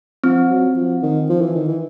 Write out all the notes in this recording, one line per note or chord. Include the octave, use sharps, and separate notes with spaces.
F3 C4
F#3
F3
D#3
F3
E3
D#3
E3